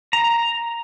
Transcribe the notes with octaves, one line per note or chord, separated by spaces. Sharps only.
A#5